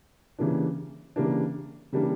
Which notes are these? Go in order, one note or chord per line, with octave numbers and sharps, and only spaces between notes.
C#3 E3 G3 A#3 D4
C#3 E3 G3 A#3 D4
C#3 E3 G3 A#3 D4